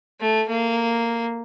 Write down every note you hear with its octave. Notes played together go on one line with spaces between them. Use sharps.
A3
A#3